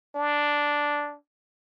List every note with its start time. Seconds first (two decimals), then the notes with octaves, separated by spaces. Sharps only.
0.15 D4